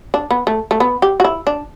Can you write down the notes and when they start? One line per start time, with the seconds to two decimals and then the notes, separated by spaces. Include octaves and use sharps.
0.14 D4
0.31 B3
0.47 A3
0.71 A3
0.80 B3
1.02 G4
1.20 F#4
1.24 E4
1.47 D4